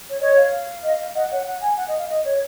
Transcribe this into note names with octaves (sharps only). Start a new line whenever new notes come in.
C#5
C#5 D#5
F5
D#5
D#5 F#5
C#5 F#5
F#5
G#5
F#5
D#5
F5
D#5
C#5